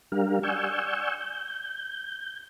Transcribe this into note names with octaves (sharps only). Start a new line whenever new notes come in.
G3 D4 G4 A#4 F5
D5 F#5 G#5 C#6 E6 G6
G6